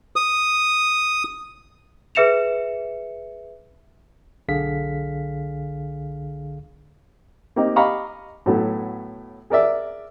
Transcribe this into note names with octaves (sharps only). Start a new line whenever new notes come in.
D#6
G#4 B4 E5 C#7 E7 F7
B1 D3 G#4 F5 B6
A#3 C4 D#4 G4
G4 D#5 F5 A#5 B5 C#6
A2 F#3 A3 B3
G#4 A#4 D5 E5